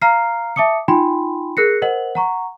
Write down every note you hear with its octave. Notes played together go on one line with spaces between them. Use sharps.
F5 A#5 F6 C7
E5 A5 D6 D#6 C#7
D#4 F4 G5 G#5 B5 C6
G#4 A#4 F#6 A#6 C7 C#7
A#4 C5 D#5 F#5 F#7
F#5 A#5 C#6